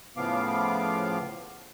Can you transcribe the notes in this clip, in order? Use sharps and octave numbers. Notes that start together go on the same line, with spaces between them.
A2 C#3 F3 B3 F5 D6